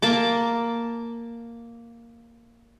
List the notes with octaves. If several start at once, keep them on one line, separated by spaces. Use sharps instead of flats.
A#3 A5 D6